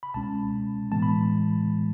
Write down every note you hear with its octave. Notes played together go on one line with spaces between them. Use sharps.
B5
C#2 B2 G#3 C#4 A5
A2 E3 G#3 B3 A5
B5